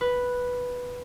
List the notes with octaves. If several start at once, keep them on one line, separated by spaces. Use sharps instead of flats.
B4